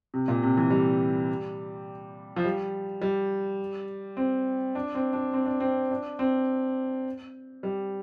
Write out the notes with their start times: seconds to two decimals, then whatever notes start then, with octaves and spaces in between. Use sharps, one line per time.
0.14 C3
0.28 A#2
0.42 C3
0.57 E3
0.70 G3
2.36 F3
2.44 G3
3.02 G3
4.17 C4
4.75 D4
4.95 C4
5.13 D4
5.33 C4
5.46 D4
5.60 C4
5.91 D4
6.19 C4
7.63 G3